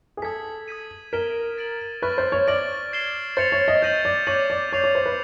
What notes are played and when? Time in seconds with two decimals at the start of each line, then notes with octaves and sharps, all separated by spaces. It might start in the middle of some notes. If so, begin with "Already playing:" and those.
0.17 G#4
0.22 A4 D#6 G#6 B6
0.68 D#6 G#6 B6 D#7
1.13 A#4 G#6 B6 E7 G7
1.58 A6 D7 F#7
2.02 B4 C#6 F6 A6
2.18 C5
2.32 C#5
2.48 D5 F6 A#6 D7 F#7
2.93 G#6 C7 E7 G7
3.37 C5 A6 C#7 F7
3.52 C#5
3.68 D#5
3.82 D#5 G6 A#6 D#7 F#7
4.05 D5
4.27 C#5 D6 G6 A#6 D#7 F#7
4.50 D5
4.72 C#5 G6 C7 F7
4.84 C#5
4.95 C5
5.06 B4